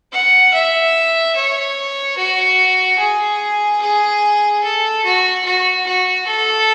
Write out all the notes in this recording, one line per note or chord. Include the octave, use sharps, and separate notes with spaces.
F#5
E5
C#5
F#4
G#4
G#4
A4
F#4
F#4
F#4
A4